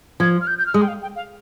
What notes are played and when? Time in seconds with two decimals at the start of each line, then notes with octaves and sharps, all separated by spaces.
0.20 F3 G#6
0.41 F6
0.47 G6
0.58 G6
0.66 F6
0.74 G#3 D#6
0.82 G5
0.88 F5
1.02 G5
1.16 F5